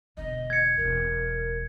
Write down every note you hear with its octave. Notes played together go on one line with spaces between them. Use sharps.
E1 D3 D#5
G#6 C#7
E1 D2 A#4